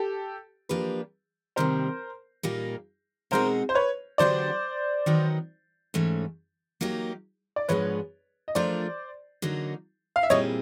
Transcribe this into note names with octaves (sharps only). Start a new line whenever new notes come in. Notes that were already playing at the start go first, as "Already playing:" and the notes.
Already playing: G4 A4
F3 A#3 D4 G4 B4
C3 D#3 G3 A#3 A#4 C5
A#2 G3 A#3 D#4 G4
B2 G#3 C4 D#4 F#4 A#4 C5
C5
B4 C#5
D3 F#3 B3 D4 G4 C5 D5
D#3 F#3 B3 D#4
G#2 E3 A3 C#4
F#3 A#3 D#4 G4
D5
G#2 F3 G#3 B3 D4 B4 C#5
D#5
F3 A3 D4 F4 A#4 C5 D5
D3 F#3 A#3 D#4
F5
E5
A#2 G3 C4 E4 G#4 C#5 D#5